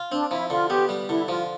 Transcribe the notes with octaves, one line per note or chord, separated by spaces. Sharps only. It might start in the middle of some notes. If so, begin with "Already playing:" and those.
Already playing: F4
C4 D4
F3 E4
D3 F4
B3 G4
G3
D3 E4
F3 F4